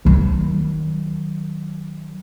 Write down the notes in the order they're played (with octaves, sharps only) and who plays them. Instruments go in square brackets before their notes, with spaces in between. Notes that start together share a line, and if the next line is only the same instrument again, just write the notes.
[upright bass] D#3 F#3